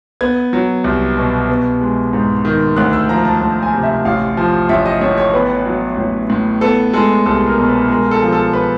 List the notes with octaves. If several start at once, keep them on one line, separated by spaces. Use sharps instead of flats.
B3 G#6
F#3
C2
B2
B3
G#3
G#2
D#3
D2 F#6
E6
F3 A#5
A5
D2 A5
G#5
C3
E5
A1 F5
F3
A1 E5
D#5
A2 C#5
C#5
B3 B4
F#3
A1
A2
B3 A4
G#3 A4
C2 A4
A#4
B2
B4
G#3 A#4
A4
F3
A4
B4